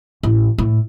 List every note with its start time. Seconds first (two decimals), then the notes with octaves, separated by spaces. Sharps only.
0.23 A1
0.58 A2